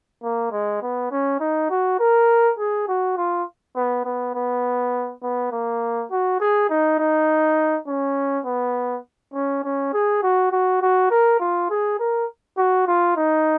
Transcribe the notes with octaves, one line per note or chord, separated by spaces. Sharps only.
A#3
G#3
B3
C#4
D#4
F#4
A#4
G#4
F#4
F4
B3
B3
B3
B3
A#3
F#4
G#4
D#4
D#4
C#4
B3
C#4
C#4
G#4
F#4
F#4
F#4
A#4
F4
G#4
A#4
F#4
F4
D#4